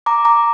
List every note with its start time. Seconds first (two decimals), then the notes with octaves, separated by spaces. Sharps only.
0.06 A#5 D6
0.25 A#5 D6